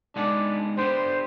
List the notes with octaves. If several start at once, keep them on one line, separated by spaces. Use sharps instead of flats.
G#3 B3 D4 D#4 G#4 D5
G3 B3 D4 C5